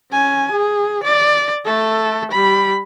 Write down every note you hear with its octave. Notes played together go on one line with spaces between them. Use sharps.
C#4 G#5
G#4
D5
A3 A4
G3 B5